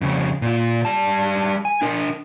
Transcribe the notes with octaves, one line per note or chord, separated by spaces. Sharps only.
F2 C#3
A#2 F4
G3 A5
G#5
D4 A#4